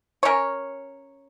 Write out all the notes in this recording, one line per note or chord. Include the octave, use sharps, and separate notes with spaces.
C#4 A#4 C#5